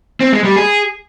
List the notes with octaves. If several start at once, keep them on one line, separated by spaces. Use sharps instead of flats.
C4
G#3
G3
G#4